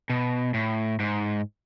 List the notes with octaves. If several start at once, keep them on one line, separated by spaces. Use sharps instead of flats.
B2
A2
G#2